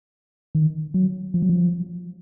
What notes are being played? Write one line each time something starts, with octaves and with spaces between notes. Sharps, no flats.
D#3
F#3
F3
F#3
F3